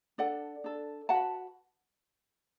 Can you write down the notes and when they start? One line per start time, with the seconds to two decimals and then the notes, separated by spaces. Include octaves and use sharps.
0.18 D4 A4 D5 F#5
0.64 D4 A4
1.09 F#4 B4 F#5 A5